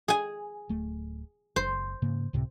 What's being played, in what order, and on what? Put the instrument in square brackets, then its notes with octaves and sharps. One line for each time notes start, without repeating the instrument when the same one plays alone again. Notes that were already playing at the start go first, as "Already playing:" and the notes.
[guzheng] G#4 G#5
[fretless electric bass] D1 A3
[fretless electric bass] F#1 [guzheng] C5
[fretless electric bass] G#2 C#3 A#3
C#2 A2 C3